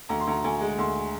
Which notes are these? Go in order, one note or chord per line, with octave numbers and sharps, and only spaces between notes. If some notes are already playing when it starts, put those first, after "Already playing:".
D2 A#5
C6
D2 A#5
D2 G#5
G#3
D2 C6